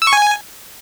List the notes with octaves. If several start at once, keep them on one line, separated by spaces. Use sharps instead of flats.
E6
C#6
G#5